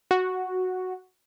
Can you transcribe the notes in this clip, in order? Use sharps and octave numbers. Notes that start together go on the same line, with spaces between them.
F#4